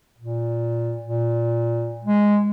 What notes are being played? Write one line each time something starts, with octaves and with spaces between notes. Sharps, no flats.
A#2
A#2
G#3